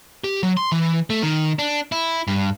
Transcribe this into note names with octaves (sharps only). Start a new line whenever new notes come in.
G4
F#3
C6
E3
A3
D#3
D4
E4
G2